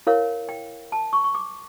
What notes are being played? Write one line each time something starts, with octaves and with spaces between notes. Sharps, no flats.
E4 A#4 C#5 F5
G5
A5
C#6
C#6
D6